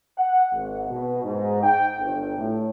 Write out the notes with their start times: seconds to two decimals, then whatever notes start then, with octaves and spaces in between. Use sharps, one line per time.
0.18 F#5
0.53 G#1
0.90 B2
1.24 G#2
1.63 G5
1.99 G1
2.38 A2